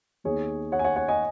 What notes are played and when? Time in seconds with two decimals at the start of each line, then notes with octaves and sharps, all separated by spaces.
0.24 D#2 D#3 B3 D#4 G#4 C#5
0.72 C#5 F#5
0.79 G#5
0.84 C#5 F#5
0.96 C#5 F#5
1.08 D#5 G#5